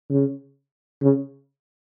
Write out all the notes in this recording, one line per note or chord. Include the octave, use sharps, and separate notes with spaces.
C#3
C#3